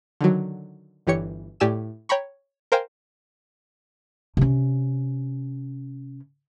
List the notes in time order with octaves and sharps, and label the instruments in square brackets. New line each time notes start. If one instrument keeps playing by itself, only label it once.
[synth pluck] D3 D#3 F#3
G1 E3 G4 C#5 C#7
A2 G4 D5 G#5 E6 E7
C#5 G5 A#5 B5 C#6
A#4 C5 F5 G5 G#5
[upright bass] C3 C#4